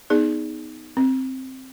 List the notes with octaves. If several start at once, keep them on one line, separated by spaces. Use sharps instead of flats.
B3 D#4 G#4 D5
C4